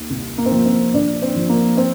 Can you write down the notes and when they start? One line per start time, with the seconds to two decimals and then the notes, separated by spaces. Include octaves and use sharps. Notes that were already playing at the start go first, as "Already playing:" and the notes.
Already playing: D#2
0.10 C2
0.38 A#3
0.46 C4
0.51 F3 A#3
0.66 C4
0.94 A#1 D4
1.22 C4
1.36 F3
1.49 A#3
1.77 C4